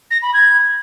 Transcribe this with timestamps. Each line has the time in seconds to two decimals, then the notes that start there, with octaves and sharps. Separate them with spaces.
0.10 A#6
0.22 B5
0.34 G#6